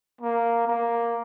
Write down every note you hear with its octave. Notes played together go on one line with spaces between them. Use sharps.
A#3
A#3